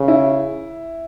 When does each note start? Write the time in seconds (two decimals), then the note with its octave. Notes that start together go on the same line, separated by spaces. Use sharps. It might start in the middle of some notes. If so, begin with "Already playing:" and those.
Already playing: C#3
0.08 E4